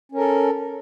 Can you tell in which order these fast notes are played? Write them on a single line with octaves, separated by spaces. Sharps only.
C#4 A#4 A4